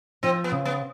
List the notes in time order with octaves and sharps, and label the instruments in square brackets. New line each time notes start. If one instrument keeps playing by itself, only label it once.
[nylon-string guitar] F3 [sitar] C4
[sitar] B3
[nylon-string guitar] C#3
[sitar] B3